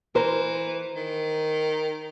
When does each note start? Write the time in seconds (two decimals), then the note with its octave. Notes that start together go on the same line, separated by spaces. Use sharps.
0.15 E3 A#4 C5
0.95 D#3